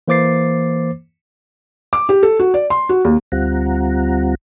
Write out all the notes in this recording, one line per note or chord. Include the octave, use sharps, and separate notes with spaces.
E3 A#3 C5 D6 A6 C7
D6
G4
A4
F#4
D5
C6
F#4
D#2
D2 G3 C4 F4 F#5 A#5